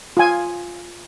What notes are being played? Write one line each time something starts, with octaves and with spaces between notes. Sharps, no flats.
F4 G#5